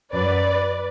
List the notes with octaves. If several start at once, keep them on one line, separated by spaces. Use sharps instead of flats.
F#2 F#3 B4 D5